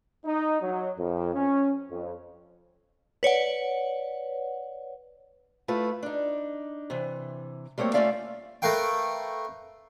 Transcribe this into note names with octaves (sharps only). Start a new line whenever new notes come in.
D#4
F#3
F2
C#4
F2
B4 C#5 D5 F#5
A3 E4 F4 B4
D4 D#4
C3 E3
G3 A3 A#3 C4 C#5
A3 C#4 F4 D5 E5 F5
A3 A#4 B4 F5 G5